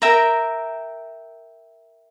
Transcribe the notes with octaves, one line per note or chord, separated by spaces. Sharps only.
A#4 E5 G5 A#5